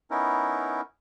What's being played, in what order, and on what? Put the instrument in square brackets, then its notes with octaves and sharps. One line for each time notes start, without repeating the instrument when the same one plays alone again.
[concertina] B3 C#4 D#4 E4 A#4